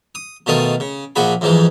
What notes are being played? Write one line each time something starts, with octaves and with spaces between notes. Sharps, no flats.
D#6
B2 D#3 A3 F4 D#5 D#6
C#3
A#1 F3 F#4 G#4 B5
F2 G#2 E3 F3 G#3